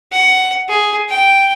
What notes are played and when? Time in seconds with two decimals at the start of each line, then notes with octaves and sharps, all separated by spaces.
0.12 F#5
0.68 G#4
1.09 G5